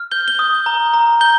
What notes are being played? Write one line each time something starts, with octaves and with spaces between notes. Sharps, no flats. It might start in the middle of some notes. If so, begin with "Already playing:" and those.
Already playing: F6
G6 G7
G7
D#6
A#5
A#5
G6 G7